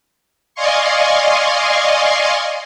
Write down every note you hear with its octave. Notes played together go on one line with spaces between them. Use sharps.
D5 D#5 F5 G#5 C6 C#6